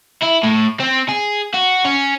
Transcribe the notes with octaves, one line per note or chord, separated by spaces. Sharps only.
E4
A2
C4
G#4
F#4
C#4